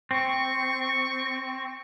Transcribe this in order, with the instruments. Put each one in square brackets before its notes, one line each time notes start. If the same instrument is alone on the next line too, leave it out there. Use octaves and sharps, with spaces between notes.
[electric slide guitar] C4 [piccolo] C#6